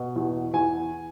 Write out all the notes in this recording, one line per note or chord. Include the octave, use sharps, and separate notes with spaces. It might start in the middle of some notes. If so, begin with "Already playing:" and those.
Already playing: B2
E2
E2 G#5